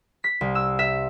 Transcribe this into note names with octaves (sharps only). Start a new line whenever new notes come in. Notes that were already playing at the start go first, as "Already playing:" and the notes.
B6
C2
E6
E5